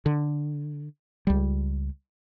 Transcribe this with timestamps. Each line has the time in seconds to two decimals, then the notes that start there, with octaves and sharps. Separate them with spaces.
0.06 D3
1.27 C#2 G3